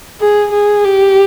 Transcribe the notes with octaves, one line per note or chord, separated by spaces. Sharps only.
G#4
G#4
G4